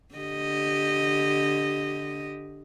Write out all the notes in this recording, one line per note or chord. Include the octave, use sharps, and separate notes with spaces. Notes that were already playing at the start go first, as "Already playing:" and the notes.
D3 G4 D#5